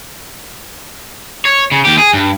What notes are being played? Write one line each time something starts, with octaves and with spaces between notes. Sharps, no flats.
C#5
C#3
D#2 G4
G#4
G2